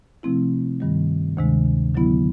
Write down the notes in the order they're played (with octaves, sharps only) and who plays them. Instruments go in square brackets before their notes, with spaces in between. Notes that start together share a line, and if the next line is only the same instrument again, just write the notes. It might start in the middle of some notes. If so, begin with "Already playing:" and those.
[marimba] C3 F3 A3 C4 E4
G2 D#3 G3
D2 C3 D#3 G#3
D3 F#3 B3 E4